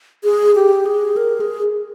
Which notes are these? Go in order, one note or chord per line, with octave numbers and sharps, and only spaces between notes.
G#4
G4
G#4
A#4
G#4